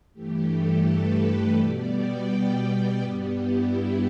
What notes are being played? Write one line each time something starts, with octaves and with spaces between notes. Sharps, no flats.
G2 E3 A3 G4
A4
B4
B2 G3 B3 D5
G5
G2 G3 B3 G4
E4
G4